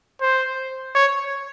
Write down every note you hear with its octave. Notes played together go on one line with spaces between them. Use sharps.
C5
C#5